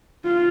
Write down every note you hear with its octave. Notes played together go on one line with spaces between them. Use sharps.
F4